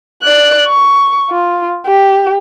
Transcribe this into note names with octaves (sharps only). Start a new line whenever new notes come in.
D5 F#6
C#6
F4
G4